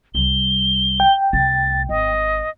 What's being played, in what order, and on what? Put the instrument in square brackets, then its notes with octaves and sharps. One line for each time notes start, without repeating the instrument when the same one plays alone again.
[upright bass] C2 G3 [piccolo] G7
[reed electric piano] G5
[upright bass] C2 A3 [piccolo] A6
[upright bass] G#1 [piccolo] D#5